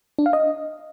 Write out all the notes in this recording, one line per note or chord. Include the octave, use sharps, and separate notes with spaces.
D4
F5
D#5